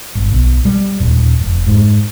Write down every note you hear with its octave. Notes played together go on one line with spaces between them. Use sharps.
G1
B1
G3
D#1
F1
G#2